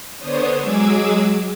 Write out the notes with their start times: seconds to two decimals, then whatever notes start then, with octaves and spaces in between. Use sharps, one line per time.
0.18 D3 B3 D4 C5 C#5 D#6
0.58 F#3 G#3 G#4 D6 E6 G#6